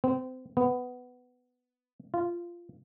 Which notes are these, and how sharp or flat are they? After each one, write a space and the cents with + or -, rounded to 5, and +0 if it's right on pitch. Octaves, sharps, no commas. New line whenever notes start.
C4 -30
B3 +10
F4 -15